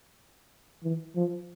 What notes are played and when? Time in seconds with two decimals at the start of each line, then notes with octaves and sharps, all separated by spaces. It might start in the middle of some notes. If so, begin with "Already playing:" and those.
0.83 E3
1.15 F3